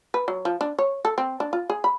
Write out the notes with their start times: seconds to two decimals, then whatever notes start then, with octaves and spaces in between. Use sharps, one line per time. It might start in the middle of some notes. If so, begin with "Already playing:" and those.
0.14 B4
0.28 F#3
0.45 F3
0.61 D4
0.79 C#5
1.05 A4
1.18 C4
1.40 D4
1.53 F4
1.70 G#4
1.84 B5